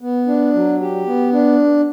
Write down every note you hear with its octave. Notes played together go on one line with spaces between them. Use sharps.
B3
D4
F#3
G4
B3
D4